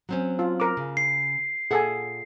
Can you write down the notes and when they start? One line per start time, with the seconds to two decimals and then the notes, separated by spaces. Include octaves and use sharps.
0.09 F#3 C4 C#4
0.39 F4
0.60 A#4 D6
0.77 C#3
0.97 C7
1.71 A#2 G#4 A4 E5 F#5 G#5